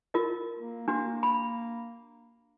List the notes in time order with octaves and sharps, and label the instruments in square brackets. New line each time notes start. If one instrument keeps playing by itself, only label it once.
[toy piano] F4 A#4 D#5
[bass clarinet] A#3
[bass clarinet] A#3 [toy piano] D4 F#4
[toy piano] B5